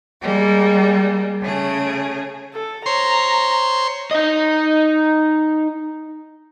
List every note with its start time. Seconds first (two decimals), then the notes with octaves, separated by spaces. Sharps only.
0.21 G3 G#3 A#3
1.41 C#3 A3 G#4
2.54 A4
2.86 C5 C#5 A#5 C6
4.11 D#4 D#5